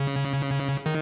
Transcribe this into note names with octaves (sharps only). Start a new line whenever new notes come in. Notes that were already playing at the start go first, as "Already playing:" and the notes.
Already playing: C#3
D#3